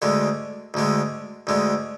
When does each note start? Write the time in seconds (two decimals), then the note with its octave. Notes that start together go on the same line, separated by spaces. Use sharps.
0.02 D2 D3 G#3
0.74 D2 D3 G#3
1.47 D2 D3 G#3